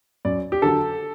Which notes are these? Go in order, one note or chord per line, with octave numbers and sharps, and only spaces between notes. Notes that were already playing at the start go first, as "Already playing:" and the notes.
F#2 D5
G4
D3 F#3 A4